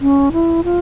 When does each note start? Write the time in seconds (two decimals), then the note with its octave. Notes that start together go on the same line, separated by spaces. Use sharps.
0.01 C#4
0.32 E4
0.64 F4